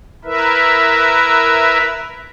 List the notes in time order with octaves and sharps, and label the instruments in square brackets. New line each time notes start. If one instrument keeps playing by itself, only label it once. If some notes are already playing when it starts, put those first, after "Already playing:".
[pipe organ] E4 A#4 B4 E5